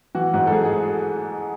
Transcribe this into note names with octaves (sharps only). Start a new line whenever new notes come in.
E3 F#4
G#2 F#4
A4
G#2 G#4
G#4